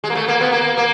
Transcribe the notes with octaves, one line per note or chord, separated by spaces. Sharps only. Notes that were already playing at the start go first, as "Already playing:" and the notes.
G#3
A#3
A3
A#3
B3
A#3
A#3